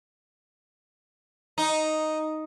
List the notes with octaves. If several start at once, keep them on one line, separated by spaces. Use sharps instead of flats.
D#4